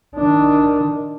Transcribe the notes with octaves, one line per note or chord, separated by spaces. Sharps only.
D#3 D4